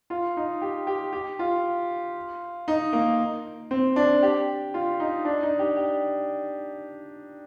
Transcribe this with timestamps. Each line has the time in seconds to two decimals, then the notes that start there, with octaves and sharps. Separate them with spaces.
0.10 F4
0.37 D#4
0.62 G4
0.87 G4
1.13 G4
1.39 F4
2.68 D#4
2.93 A#3
3.71 C4
3.96 D4
4.23 G4
4.74 F4
5.00 D#4
5.25 D4
5.42 D#4
5.59 G4
5.77 G4